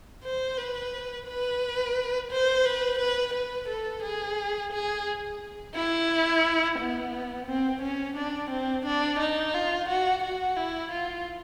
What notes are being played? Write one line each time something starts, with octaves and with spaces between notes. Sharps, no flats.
C5
B4
B4
C5
B4
B4
B4
A4
G#4
G#4
E4
B3
C4
C#4
D4
C4
D4
D#4
F4
F#4
F#4
E4
F4